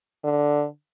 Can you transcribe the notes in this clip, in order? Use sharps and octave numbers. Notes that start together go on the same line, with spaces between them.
D3